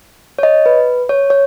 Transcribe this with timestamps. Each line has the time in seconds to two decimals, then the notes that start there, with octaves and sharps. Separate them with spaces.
0.39 C#5
0.43 D#5
0.66 B4
1.09 C#5
1.30 C#5